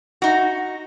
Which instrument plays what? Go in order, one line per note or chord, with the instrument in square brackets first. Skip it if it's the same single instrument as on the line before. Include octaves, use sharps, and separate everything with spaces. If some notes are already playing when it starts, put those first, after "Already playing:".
[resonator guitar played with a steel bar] D#4 F#4